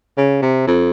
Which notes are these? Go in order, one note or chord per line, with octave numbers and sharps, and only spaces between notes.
C#3
C3
F2